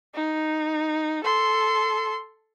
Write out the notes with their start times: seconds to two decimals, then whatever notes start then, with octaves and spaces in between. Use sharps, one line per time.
0.15 D#4
1.24 A4 C6